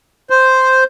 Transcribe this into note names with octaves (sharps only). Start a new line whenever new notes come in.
C5